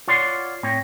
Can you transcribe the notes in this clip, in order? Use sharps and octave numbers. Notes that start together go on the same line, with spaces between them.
F4 C#5 D5 F#5 C6
A2 C4 C#5